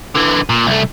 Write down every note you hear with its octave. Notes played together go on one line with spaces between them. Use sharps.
D3 E3
A#2
C2 A3